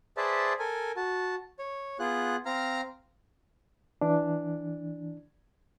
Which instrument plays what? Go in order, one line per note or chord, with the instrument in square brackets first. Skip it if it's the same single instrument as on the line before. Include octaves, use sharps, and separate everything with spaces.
[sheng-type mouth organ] G#4 B4 C5 D5 E5 A5
A4 A#4 G#5
F#4 A5
C#5
B3 F4 G#4 F#6
C4 F5 A#5 F6
[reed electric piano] E3 D4